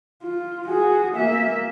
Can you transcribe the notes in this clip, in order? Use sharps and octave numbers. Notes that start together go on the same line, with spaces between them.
F4
F#4 G#4
A#3 E5